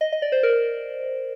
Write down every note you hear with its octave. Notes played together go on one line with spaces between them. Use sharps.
D#5
D#5
D5
C5
A#4